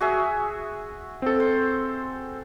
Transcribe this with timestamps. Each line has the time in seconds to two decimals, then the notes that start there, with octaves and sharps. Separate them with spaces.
0.01 F#4 G#4 E5
1.22 C4 A4
1.40 C5